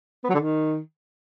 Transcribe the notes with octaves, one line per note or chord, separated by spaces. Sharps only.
B3
F#3
D3
D#3